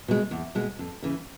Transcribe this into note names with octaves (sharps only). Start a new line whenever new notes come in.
B2 G#3
E2
B2 G#3
F2
C#3 E3